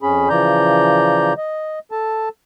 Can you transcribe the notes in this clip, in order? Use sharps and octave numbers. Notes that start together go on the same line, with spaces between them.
F2 C#4 G#4 B5
C#3 E3 F3 D5 A#5 G6
D#5
A4 A5